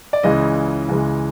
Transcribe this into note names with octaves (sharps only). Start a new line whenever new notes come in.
D5
C#2 C#3 E3 G#3 D#5
C#2 C#3 E3 G#3